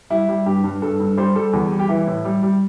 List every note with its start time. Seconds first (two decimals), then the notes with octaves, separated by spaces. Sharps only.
0.10 G3 E4
0.29 G3
0.46 G2 G4
0.64 G2
0.82 G2 A4
1.00 G2
1.17 G3 C5
1.35 G3 A4
1.53 E2
1.71 G3
1.79 G4
1.89 E3 E4
2.07 A2
2.25 G3
2.43 G3